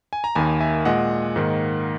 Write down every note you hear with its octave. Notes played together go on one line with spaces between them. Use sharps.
G#5
A#5
D#2 D#3 A#3 G#5 B5
E5 G#5
A#2 G#3 D#5 F#5
G#2 D#3 A#3